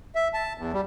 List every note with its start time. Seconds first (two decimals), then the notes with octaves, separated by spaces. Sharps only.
0.15 E5
0.34 A5
0.58 E2
0.73 G3